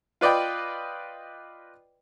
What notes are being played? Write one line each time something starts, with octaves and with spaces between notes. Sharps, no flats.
F4 B4 D5 D#5 G5